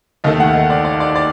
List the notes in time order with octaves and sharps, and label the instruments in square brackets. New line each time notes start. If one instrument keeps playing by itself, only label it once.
[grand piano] D#2 D#3 A3 D#5
F#5
D#5
D5
D5
D5
D5